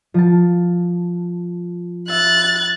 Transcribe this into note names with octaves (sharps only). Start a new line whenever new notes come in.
F3 A5
E5 F#6 A6